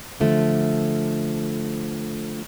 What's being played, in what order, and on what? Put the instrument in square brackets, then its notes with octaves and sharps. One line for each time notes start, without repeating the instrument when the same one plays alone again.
[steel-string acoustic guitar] D3 F3 A3